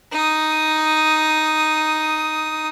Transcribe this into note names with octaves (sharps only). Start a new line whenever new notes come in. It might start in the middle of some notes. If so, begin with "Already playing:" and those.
D#4 D#6